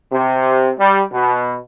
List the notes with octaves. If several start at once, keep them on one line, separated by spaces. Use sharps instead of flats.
C3
G3
B2